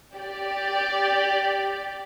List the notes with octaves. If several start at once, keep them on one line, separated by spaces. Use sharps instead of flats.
G4 D5